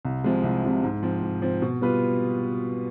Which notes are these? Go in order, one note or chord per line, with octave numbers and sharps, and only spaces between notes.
C2
C3 F3 G#3
C2
C3 F3 G#3
G#2
F3 C4
G#2
F3 C4
B2
G3 B3 F4 B4